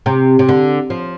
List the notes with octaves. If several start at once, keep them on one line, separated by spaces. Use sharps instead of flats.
C3
C3
D3
F3